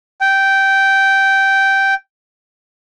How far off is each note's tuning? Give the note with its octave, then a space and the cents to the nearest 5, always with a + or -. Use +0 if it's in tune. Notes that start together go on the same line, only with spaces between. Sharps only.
G5 -10